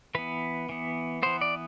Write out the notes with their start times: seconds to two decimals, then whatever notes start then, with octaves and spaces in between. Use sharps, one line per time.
0.15 E3 B3 B4
0.69 E3 B3
1.23 E3 B3 C5
1.41 D5